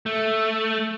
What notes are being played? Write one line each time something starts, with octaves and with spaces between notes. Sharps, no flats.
A3